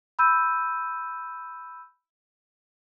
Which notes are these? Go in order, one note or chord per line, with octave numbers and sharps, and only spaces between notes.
B5 E6 G6 D#7